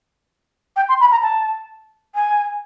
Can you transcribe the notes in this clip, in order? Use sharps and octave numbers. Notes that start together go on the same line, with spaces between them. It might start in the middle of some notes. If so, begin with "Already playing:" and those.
G5
C6
B5
A#5
A5
G#5